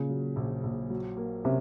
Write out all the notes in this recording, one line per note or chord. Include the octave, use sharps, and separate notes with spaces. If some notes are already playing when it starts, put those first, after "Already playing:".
Already playing: A#2 C#3
F#3
A#1
A#1
F#3
A#3
C3 C#4